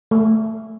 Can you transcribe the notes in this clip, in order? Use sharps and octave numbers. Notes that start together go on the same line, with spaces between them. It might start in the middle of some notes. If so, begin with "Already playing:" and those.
A3